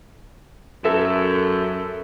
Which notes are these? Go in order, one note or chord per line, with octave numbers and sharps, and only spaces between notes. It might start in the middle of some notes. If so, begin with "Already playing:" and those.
F#2 A4 E5 E7